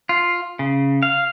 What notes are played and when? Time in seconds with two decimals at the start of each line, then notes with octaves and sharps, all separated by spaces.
0.09 F4
0.59 C#3
1.03 F5